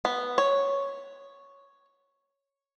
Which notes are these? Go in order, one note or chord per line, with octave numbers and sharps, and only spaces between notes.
B3
C#5